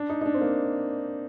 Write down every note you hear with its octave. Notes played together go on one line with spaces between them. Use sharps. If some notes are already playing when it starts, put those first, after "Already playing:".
Already playing: D4
D#4
D#4
D4
C4
A#3